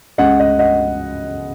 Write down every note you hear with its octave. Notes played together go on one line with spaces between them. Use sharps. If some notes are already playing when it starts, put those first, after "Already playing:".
C#2 C#3 G#3 D#5 F#5
D#5 F#5
D#5 F#5